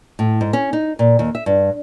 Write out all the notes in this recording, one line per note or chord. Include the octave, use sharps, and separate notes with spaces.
A2
G#2
C#4
D#4
A#2
D#2
E5
G2